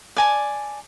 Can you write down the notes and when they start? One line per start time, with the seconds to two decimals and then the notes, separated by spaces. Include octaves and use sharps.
0.16 D5 G#5 A5